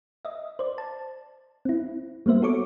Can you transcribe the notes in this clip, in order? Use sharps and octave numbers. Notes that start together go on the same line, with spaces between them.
D#5 E5
C5 D5
A5
C4 E4
G3 A#3 B3 C5 E5
F#4 A4 C#5 C#6 D6